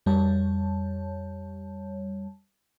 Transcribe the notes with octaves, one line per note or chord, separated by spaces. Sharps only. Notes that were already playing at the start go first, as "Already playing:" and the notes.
F2 G3 C#5 A5